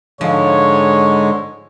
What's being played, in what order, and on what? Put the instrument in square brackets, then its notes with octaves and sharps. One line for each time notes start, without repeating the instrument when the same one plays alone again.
[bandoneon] G#2 D3 G#3 [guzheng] F3 [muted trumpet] C#5